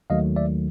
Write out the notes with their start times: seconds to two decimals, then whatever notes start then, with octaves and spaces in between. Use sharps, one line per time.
0.10 D#2 D#3 F#3 A3 D#5 F5
0.36 D5 E5